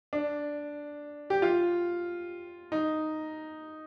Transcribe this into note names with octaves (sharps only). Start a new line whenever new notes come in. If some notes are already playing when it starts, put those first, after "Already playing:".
D4
G4
F4
D#4